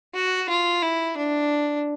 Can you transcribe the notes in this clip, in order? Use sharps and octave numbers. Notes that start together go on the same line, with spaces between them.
F#4
F4
E4
D4